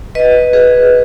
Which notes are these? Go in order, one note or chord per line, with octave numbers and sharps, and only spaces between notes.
B4 D#5
G#4 B4